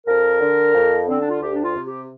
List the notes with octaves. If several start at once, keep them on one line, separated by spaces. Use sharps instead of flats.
F2 A#4
D3
F2
D3 C4
D4
F4
D2 G4
D4
F4
C3
G4